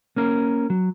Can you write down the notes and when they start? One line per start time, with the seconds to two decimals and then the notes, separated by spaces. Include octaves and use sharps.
0.16 A#3 C#4 A#4
0.70 F#3